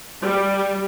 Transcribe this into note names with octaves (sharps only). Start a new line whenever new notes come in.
G3